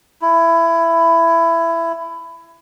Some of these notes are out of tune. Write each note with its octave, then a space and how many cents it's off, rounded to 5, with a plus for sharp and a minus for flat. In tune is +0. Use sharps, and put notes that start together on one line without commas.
E4 +15